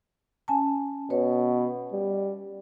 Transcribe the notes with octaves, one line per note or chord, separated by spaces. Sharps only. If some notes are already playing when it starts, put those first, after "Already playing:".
C#4 G#5 A5
B2 B4 C#5
G3